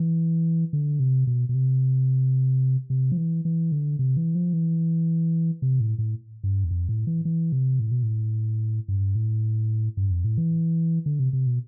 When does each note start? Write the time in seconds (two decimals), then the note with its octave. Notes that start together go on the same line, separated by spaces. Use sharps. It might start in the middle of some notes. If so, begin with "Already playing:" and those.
Already playing: E3
0.73 D3
1.00 C3
1.27 B2
1.49 B2
1.54 C3
2.90 C3
3.12 F3
3.17 E3
3.45 E3
3.72 D3
3.99 C3
4.17 E3
4.35 F3
4.53 E3
5.62 C3
5.80 A2
5.98 A2
6.43 G2
6.64 E2
6.71 F2
6.89 A2
7.07 E3
7.25 E3
7.52 C3
7.79 A2
7.91 B2
8.03 A2
8.88 G2
9.15 A2
9.97 G2
10.11 F2
10.24 A2
10.38 E3
11.06 D3
11.19 C3
11.33 C3
11.47 B2